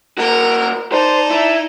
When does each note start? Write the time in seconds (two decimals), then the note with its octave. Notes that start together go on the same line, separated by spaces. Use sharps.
0.18 A#3 F#4 A#4
0.92 D#4 C5 D5 A5
1.31 E4